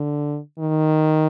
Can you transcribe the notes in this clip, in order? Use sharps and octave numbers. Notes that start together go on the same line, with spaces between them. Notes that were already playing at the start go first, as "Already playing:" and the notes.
Already playing: D3
D#3